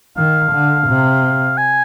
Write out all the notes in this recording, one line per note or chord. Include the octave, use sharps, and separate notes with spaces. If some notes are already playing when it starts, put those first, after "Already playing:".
D#3 F5
D3
C3
G#5